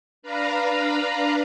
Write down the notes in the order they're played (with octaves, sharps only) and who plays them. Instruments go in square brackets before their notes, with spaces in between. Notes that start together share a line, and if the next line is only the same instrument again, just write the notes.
[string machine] D4 B4 F5 A#5 B5